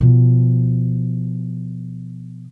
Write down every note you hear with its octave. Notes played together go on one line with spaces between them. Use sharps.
B2 F3